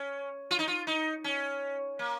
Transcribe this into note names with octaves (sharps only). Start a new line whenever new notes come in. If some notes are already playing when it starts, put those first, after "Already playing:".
Already playing: C#4
F4
D#4
F4
D#4
C#4
A#3